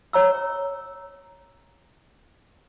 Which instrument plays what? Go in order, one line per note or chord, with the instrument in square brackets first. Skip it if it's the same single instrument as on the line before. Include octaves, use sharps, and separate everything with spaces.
[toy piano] C#5 A#5 E6